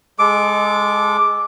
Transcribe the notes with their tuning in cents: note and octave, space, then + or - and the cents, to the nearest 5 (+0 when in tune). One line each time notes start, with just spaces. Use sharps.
G#3 +0 A4 -25 D6 +0